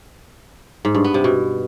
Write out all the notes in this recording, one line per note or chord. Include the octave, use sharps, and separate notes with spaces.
G#2
G2
B3
C3
B2